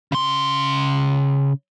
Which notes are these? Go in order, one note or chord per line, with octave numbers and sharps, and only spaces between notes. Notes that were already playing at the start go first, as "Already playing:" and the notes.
C#3 C6